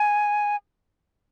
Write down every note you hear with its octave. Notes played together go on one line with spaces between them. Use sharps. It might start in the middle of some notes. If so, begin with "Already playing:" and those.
Already playing: G#5